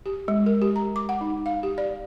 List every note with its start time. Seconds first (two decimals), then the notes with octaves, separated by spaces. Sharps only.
0.06 G4
0.28 G#3
0.46 A#4
0.62 G4
0.76 A#5
0.96 D6
1.09 F#5
1.21 D#4
1.46 F5
1.63 G4
1.78 D5